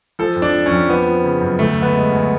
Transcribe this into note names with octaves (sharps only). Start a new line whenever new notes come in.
F3 A4
F2
D4
F3
F2 C#4
F3 B3
F3
C#3
F#2
D2 A3
D2
B3
G#3
D2